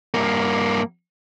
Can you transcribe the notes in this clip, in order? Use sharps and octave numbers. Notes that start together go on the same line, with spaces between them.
G2 A#3